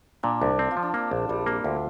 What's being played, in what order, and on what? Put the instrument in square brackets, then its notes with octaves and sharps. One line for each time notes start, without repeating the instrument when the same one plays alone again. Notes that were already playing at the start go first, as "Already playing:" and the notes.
[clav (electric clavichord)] A#2 [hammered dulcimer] D4
[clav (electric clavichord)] C2 [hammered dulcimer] D4
[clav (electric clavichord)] C4 [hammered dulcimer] D4
[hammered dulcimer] F4
[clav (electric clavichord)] F3
[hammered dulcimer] D4
[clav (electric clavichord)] A#3 [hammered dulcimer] C4
[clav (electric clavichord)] A#1
[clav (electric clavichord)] A#1 [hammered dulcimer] G3
[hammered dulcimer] G3 [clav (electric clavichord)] A#3
[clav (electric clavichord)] D2 [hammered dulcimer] F4